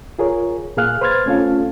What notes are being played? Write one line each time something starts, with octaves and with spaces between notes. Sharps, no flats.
F4 G#4 A#4 C#5
A#2 A#3 G#4 F5 F6 F#6
B4 C5 C6 F6 G#6 A6
A3 C4 C#4 F4 A4 F5